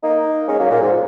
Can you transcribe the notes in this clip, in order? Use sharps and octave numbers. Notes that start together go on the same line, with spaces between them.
A#3 D#4
G#3 C#4
F#3 A#3
A#2
G#2